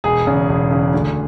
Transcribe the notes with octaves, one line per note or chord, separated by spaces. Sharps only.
E1 G#4
E2 C#3
E1
E2 C#3
D2